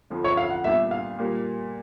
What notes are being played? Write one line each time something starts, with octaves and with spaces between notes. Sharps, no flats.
F2 D3 F3
C#5
F5
F#5
A#2 G3 B3 D4 G4 E5
F5
A#2 G3 A#3